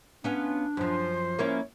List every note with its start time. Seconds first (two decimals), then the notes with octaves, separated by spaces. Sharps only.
0.24 B3 C#4 D4 F4
0.77 F#2 F3 C5
1.39 A#3 C#4 E4 C#5